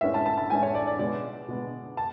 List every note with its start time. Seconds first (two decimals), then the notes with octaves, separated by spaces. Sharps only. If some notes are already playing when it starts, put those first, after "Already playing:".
0.01 A2 G#3 C#4 E4 E5
0.14 A5
0.26 A5
0.38 A5
0.50 A2 G#3 C#4 E4 G#5
0.63 C#5
0.74 D5
0.87 D5
0.99 B2 G#3 B3 D5
1.48 B2 G#3 B3
1.97 A5